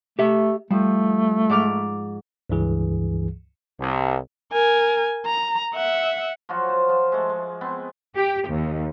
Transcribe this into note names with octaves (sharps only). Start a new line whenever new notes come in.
A3 G4 E5
F3 G3 A3
G#2 D6 F6
C#2 G2 E3 G#4
C2
A#4 G#5
A#5
E5 F#5
F3 F#3 F4 F#4
C5
F3
G#3 A3
G#3
B3 C4
G4
D#2